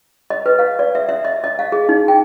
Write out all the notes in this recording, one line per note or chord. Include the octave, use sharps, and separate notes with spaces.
D#5
B4
F5
D5
E5
E5
D#5
D#5
F5
G#4
D#4
G5